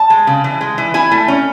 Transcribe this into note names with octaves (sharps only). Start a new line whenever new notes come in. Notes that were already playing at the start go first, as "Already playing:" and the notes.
Already playing: A5
G#3
C#3
E3
G#3
E3
E4 G#5
A3
C#4